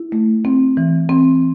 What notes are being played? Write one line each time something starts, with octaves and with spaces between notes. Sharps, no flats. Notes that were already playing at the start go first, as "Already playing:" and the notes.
Already playing: E4
A3
C4
E3
C4